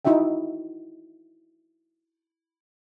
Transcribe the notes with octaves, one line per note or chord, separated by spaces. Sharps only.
D#4 E4 F#4 E5 G5